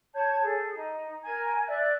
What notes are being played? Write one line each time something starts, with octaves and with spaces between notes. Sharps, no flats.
C#5 A5 G6 G#6
G#4 A4
D#4
A#4 G#5 G#6
D5 E5 F#6